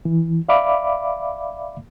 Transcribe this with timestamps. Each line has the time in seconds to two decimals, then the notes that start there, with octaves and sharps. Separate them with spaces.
0.05 E3
0.49 D5 E5 F5 B5 D6